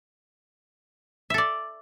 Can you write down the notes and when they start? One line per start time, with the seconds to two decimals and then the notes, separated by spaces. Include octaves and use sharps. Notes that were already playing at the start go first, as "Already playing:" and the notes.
1.30 E5
1.34 A4
1.38 D5